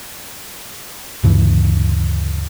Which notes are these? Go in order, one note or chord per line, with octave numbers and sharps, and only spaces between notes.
D2 G2 C#3 E3